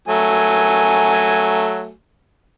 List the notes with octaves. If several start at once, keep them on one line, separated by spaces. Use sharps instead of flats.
F#3 A3 G#5